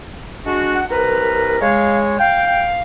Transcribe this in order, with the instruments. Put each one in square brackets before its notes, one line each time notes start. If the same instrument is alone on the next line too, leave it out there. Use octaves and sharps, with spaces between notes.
[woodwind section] G#3 D4 F#4
[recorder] F#5
[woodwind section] C2 A#4 A#5 [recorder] B4
[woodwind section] G#3 C#5 [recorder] F5
[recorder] F5 [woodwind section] G5